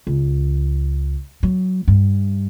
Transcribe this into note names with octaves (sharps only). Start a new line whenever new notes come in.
C#2
F#3
G2